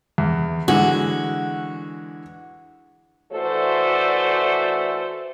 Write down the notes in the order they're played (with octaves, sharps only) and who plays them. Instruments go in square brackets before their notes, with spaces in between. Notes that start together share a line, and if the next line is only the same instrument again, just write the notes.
[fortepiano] E2
[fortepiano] D3 E3 G#3 [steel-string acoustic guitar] F#4
[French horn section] E3 A3 F#4 A4 C5 D5